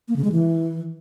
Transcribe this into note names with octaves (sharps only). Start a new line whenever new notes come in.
A#3
C#3
G#3
E3